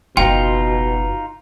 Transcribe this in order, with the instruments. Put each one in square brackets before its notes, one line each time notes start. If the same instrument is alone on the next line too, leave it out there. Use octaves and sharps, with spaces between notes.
[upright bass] F#1 [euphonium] B2 [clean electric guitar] D#4 F4 [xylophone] G5